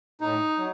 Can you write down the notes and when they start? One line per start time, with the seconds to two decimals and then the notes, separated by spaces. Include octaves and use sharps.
0.21 A2 D#4
0.58 F#3